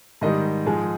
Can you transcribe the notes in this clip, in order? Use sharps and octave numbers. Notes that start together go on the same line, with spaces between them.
G#2 D#3 G3 D#5
G#2 F3 G#3